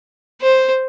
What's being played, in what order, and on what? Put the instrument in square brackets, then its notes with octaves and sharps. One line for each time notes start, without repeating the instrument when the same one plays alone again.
[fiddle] C5